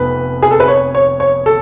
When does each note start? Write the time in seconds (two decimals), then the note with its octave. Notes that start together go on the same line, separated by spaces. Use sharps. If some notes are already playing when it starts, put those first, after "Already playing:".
Already playing: F1 F2 B3 B4
0.43 G#4
0.51 A4
0.60 B4
0.68 C#5
0.95 C#5
1.20 C#5
1.46 A4